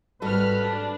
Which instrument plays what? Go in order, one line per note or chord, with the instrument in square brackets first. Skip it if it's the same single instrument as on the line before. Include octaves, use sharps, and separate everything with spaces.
[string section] G#1 F6 [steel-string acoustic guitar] G3 F#4 A4 [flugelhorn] B4
[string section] D4